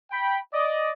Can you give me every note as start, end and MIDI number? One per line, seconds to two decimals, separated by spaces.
0.11 0.38 79
0.11 0.38 83
0.53 0.90 74
0.53 0.90 75